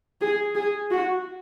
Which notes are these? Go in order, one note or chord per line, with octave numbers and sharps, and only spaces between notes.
G#4
G#4
F#4